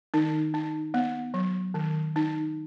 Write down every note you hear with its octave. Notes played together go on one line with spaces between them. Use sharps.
D#3 D#4
D#4
B3
F#3
D#3
D#4